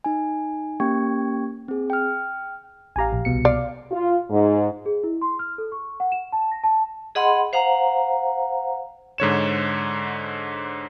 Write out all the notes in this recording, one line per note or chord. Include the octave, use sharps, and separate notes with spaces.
D#4 G#5
A#3 C#4 G4 G5 C#6 G#6
C4 G#4
G5 F6
A1 G4 F5 G#5 A#5
A#1
C2 B2 C#7
D5 F5
F4
G#2
G#4
E4
C6
F6
A4
C#6
F#5
E7
A5
A#6
A5
G#4 D#5 F#5 B5 C6
C5 F5 F#5 A#5
G#2 D3 C#5 E7